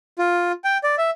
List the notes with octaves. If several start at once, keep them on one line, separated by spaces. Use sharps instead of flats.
F4
G5
D5
E5